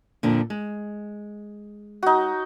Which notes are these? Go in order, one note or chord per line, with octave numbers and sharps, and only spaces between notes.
F2 A#2 D3
G#3
D#4 F#4